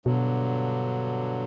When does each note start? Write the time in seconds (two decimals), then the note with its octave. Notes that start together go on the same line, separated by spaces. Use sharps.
0.06 G2 B2 D3 F#3